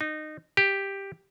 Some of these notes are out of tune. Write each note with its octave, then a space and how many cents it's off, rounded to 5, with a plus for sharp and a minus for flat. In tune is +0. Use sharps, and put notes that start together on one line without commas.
D#4 -20
G4 +5